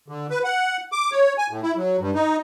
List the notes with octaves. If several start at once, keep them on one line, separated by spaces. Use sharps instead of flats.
D3
B4
F#5
D6
C#5
G#5
A2
E4
F#3
G2
D#4